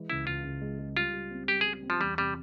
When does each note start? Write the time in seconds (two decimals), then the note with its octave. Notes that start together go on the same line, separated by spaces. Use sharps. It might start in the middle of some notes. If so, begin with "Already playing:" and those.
Already playing: E3 G#3
0.10 C#2 E4
0.27 C#2 F4
0.44 C#2
0.61 G#3
0.79 G#3
0.96 G3 F4
1.13 G3
1.31 C4
1.48 G3 G4
1.61 G3 G#4
1.83 C4
1.90 F3
2.00 E2 G3
2.17 C3 G3